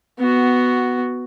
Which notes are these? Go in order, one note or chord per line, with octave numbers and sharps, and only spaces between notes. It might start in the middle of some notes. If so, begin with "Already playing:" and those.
B3 F#4